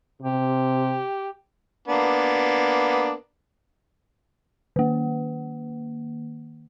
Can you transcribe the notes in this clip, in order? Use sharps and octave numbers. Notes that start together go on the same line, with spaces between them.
C3 G4
A#3 B3 D4
D#3 A#3